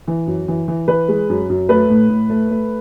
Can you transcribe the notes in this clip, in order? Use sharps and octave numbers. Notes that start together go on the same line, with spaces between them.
E3
F#2
E3
E3
E3 B4
G#3
F#2
F#2
A3 B4
A2
A2
A3
A3